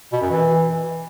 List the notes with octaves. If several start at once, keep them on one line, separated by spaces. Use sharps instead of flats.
B2
F#2
E3